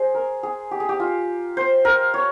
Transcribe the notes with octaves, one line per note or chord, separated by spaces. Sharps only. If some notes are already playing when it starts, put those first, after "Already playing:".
Already playing: G#4 C5
A#4
G#4
G4
G#4
G4
F4
C5
A#4
C#5